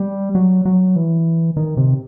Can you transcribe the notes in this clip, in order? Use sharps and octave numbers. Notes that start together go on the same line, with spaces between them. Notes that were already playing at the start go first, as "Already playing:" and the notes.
Already playing: G3
F#3
F#3
E3
D#3
C3